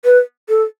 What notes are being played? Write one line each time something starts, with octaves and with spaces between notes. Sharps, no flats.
B4
A4